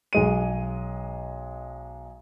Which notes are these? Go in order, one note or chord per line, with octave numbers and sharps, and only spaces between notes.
B1 G#3 D#7